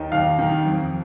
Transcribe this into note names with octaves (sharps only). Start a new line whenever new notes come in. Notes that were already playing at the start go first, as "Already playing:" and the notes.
Already playing: D#2 D#3 D#5
D#2 F5
D#3
F2